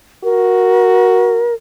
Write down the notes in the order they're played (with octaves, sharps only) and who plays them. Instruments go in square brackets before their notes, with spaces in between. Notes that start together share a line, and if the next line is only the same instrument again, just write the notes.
[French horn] F#4 [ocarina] A#4